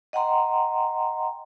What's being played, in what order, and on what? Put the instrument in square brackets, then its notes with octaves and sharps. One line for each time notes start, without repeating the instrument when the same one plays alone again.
[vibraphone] D#5 F#5 G5 A#5 C6